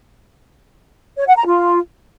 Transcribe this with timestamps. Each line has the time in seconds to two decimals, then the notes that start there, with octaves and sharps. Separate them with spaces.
1.17 C#5
1.27 F#5
1.37 A#5
1.46 F4